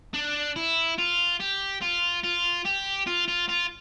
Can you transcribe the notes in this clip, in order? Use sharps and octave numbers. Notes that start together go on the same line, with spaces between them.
D4
E4
F4
G4
F4
F4
G4
F4
F4
F4